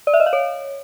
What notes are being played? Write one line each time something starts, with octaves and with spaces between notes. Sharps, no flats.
D5
E5
D#5
F5
C#5